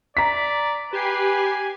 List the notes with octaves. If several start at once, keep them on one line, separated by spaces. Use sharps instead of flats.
D5 A#5 B6
G4 B4 G#5 C7